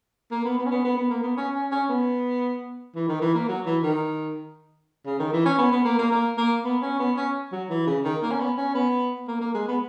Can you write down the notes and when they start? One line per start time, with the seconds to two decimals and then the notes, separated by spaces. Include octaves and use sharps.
0.32 A#3
0.44 B3
0.58 B3
0.66 C#4
0.71 B3
0.85 B3
0.97 B3
1.10 A#3
1.23 B3
1.37 C#4
1.54 C#4
1.72 C#4
1.89 B3
2.95 E3
3.09 D#3
3.22 E3
3.35 A#3
3.48 F#3
3.66 E3
3.83 D#3
5.06 C#3
5.19 D#3
5.33 E3
5.46 C#4
5.58 B3
5.72 B3
5.85 A#3
5.99 A#3
6.12 A#3
6.38 A#3
6.65 B3
6.82 C#4
6.99 B3
7.17 C#4
7.52 F#3
7.70 E3
7.87 C#3
8.05 D#3
8.23 A#3
8.31 C#4
8.40 B3
8.58 C#4
8.75 B3
9.28 A#3
9.41 A#3
9.54 G#3
9.68 B3